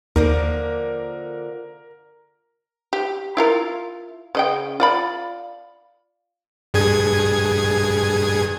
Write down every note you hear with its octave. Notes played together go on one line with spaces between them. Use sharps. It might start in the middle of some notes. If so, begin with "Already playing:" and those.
D#2 D3 F3 A#3 A#4
G4
E4 F4 A#4
C#3 D#5 G5
F4 D5 B5
G2 G#4 G#6